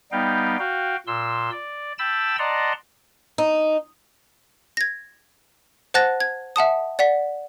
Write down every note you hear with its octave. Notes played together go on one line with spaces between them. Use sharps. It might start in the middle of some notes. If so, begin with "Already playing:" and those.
G3 B3 D#4 F5 G5
F#4 F5 G5
A#2 C6 E6
D5
G5 A5 B5 E6 A6
D5 D#5 F#5 A5 A#5 C6
D#4
G#6 A#6
C5 F#5 A5 F#6 A6 A#6
G#6
E5 F#5 A5 D#6
D5 F#5 B6